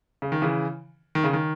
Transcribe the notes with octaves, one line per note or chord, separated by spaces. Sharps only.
C#3
D#3
C#3 E3
D#3
C#3
D#3